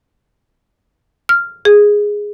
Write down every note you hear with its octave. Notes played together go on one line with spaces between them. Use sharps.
F6
G#4